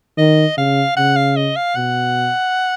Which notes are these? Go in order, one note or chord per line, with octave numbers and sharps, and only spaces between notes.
D#3 D#5
C#3 F5
C#3 F#5
F5
D#5
F5
B2 F#5